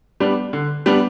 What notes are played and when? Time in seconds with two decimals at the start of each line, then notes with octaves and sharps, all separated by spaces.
0.20 G3 B3 D4
0.53 D3
0.86 G3 B3 D4